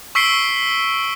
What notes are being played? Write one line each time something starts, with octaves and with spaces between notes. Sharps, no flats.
C#6 E6 B6 C7 D7 G7